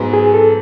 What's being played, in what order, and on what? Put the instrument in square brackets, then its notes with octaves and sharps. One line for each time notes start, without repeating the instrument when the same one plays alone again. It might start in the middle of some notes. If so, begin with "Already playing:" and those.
Already playing: [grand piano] G#2 F#3 B3
[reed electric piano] G#4
A4